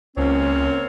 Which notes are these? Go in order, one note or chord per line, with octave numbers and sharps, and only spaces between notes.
C#2 A#3 C4 C#4 C#5